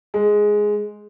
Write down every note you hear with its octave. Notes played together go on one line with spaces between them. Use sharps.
G#3